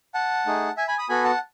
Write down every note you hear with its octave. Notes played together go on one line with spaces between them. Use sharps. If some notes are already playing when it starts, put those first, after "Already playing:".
F#5 A5
A3 D#4 G#4
E5 G#5
G#5 B5
B5 D#6
B3 F#4 A4 G#5 B5
F#5 A5